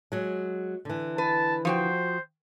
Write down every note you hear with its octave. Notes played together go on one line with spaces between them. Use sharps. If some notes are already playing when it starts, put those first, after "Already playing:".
F#3 G#3
D3 E3
B4 A5
F3 F#4 C5 G5